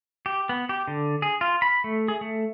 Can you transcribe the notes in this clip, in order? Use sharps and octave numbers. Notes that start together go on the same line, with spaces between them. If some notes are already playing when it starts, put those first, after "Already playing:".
G4
B3
G4
D3
G#4
F4
B5
A3
G#4
A3